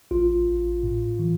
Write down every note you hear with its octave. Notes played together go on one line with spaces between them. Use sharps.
A1 F4
A1
A2
E3